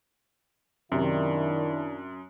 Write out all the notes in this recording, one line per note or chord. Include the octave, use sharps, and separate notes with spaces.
F#2 C3 D#3 D4 E4